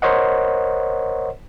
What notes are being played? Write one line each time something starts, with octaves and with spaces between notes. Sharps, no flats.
A#4 C5 C#5 D#5 F#5